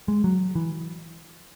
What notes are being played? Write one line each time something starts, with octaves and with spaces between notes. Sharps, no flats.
G#3
F#3
E3